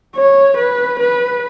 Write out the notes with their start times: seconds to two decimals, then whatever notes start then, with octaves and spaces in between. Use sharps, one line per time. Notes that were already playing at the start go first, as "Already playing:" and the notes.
0.16 C#5
0.58 B4
1.00 B4